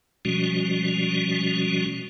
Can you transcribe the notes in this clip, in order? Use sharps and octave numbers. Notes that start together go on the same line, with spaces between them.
B2 F3 G3 G#3 C#4 F#4